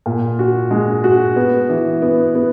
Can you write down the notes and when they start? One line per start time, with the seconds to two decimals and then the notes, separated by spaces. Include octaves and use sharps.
0.06 A#2
0.39 F#4
0.71 G#3
1.04 F#4
1.36 B3
1.69 E3
2.02 B3
2.35 B3